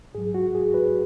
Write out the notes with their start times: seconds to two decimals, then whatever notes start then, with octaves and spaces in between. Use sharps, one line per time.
0.15 G#2 F#3 G#4
0.34 F#4
0.55 G#4
0.74 B4